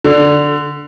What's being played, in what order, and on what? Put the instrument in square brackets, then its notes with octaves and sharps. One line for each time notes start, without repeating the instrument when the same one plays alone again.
[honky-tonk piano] D3